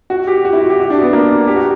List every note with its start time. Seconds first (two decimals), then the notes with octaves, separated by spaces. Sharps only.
0.10 F#4
0.27 G4
0.45 F#4
0.53 E4
0.70 G4
0.80 F#4
0.90 D4
1.02 B3
1.13 A#3
1.47 G4
1.56 F#4